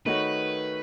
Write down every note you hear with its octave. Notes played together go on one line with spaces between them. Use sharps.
D#3 A3 D#4 F#4 B4 C#5